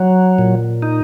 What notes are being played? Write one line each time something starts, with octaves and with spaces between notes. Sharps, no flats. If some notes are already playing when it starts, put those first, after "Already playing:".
Already playing: F#3
A#2
D#4